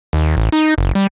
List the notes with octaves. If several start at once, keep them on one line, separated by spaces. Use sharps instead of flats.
D#2
A1
D#4
F#1
G3